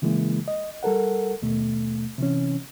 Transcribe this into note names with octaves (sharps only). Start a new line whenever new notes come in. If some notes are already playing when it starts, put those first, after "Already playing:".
C#3 E3 G#3 A#3 E4
D#5
G3 A4 A#4 F#5
D#2 B2 A3
C3 E3 C#4